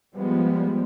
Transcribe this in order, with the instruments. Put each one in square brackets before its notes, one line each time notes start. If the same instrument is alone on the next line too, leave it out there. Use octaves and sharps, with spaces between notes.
[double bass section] F3 G3 G#3 B3